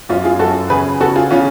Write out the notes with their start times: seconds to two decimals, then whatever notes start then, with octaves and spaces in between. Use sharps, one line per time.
0.09 F#2 C#4 F4
0.24 F4 G#4
0.39 F#2 F#4 A4
0.70 C#3 G#4 B4
1.01 C#3 F#4 A4
1.16 F4 G#4
1.31 C#3 C#4 F4